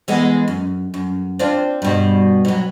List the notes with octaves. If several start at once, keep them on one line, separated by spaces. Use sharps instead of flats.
E3 G#3 B3
F#2
F#2
C4 D4 F4
G2 B2
B2 F#3